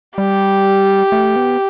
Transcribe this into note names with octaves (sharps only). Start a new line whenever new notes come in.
G3 G4
A3
B3